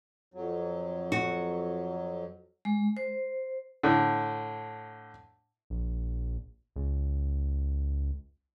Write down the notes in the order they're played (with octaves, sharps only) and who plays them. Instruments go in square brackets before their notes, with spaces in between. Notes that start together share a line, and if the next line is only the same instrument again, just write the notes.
[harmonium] F2 F#3
[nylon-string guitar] F#4
[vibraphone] G#3
C5
[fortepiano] A2 D3
[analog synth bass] A#1
C#2